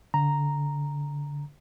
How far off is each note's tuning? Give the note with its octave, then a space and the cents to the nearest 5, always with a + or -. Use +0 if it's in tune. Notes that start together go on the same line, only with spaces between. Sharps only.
D3 -25 A#5 +0